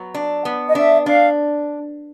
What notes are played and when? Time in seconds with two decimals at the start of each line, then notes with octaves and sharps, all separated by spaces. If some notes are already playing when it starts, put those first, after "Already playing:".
Already playing: F#3 B3
0.14 D4
0.45 B3
0.69 D#5
0.75 D4 E5
1.06 D4 F5